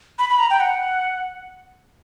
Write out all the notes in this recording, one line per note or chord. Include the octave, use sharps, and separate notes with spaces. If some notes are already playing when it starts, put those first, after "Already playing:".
B5
B5
A#5
G5
F#5